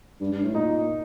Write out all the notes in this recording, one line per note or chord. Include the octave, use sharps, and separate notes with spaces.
G2
G2
A2
A#2 D#4